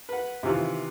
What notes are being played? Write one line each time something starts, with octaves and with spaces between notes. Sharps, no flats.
B4 F#5
C3 D#3 E3 F4